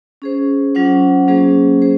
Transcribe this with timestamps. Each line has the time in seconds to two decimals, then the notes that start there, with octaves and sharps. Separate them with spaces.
0.22 C#4 G#4 C5
0.75 F#3 C#4 F4 C5 F#5
1.28 F#3 A#3 C#4 G#4 C5
1.82 G#4 C5